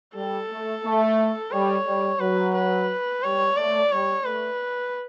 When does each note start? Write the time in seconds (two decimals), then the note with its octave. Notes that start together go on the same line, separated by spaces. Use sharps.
0.15 G3 A4
0.50 A3
0.84 A3
1.51 G3 C#5
1.86 G3
2.20 F#3 B4
2.54 B4
3.22 G3 C#5
3.56 A3 D5
3.91 G3 C#5
4.25 A3 B4